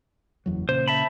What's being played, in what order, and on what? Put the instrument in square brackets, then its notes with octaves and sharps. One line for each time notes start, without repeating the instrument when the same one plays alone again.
[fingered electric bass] F#1 E2 F#3
[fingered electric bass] A#2 C#3 [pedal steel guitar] C5
[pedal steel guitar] E5 A5 B5